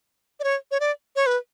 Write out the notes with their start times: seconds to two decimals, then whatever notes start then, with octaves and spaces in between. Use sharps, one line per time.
0.40 D5
0.44 C#5
0.71 C#5
0.80 D5
1.16 C#5
1.26 B4